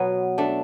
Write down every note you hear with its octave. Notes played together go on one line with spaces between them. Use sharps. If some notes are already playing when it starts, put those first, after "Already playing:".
Already playing: B2 F#3 B3
A3 D4